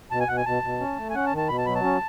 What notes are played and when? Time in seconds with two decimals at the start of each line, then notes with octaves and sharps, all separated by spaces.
0.11 B2 A5
0.20 G#5
0.28 B2 F#5
0.37 G#5
0.46 B2 A5
0.63 B2
0.80 C#4
0.97 A3
1.10 G#5
1.15 C#4 F#5
1.26 A5
1.33 D#3
1.38 A5
1.49 B2 B5
1.58 A5
1.66 F#3 B5
1.75 A5
1.84 C#4